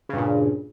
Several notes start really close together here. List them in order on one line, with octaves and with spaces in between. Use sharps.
C#3 G2 A#2